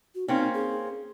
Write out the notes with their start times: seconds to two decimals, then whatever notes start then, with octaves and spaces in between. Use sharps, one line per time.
0.15 F#4
0.28 A#3 C4 C#4 D#4
0.54 G#4